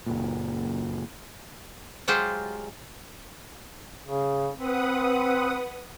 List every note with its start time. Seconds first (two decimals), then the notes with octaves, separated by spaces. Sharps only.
0.06 F#1 A#2
2.08 F#3 G#3 F4 G4 C5
4.04 C#3
4.57 C4 B4 F#5 D#6